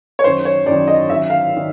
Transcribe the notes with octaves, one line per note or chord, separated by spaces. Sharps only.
C#5
F#2 D#3 C5
C#5
F#2 D#3 D5
D#5
F#2 D#3 E5
F5
D#3